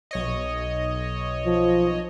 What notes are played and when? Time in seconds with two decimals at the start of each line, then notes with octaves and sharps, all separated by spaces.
0.11 B1 C#5 D#5
1.46 F3